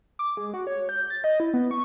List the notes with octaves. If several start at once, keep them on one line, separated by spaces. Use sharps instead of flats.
D6
G#3
F#4
C#5
G6
A6
D#5
E4
B3
C#6